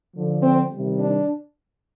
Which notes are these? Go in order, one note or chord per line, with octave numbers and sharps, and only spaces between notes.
D3 F3
C4
C3 D#3 G3
D4